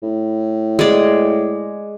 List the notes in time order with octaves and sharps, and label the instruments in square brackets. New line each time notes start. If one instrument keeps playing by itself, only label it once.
[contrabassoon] A2
[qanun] G#3 D5